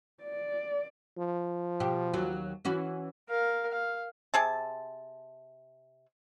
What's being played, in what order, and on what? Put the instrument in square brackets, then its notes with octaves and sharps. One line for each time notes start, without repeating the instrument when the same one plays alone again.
[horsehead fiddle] D5
[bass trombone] F3
[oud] B2 G4
D#2 F#3
E3 C#4 F#4
[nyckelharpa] A#4 F5
F5
[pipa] C3 G#4 A5